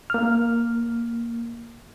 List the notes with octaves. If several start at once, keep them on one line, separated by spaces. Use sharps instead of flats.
A#3 F6